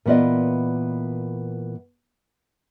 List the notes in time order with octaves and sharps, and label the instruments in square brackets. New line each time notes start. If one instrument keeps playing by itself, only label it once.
[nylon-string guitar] A#2 E3 B3 F4 D5 D#5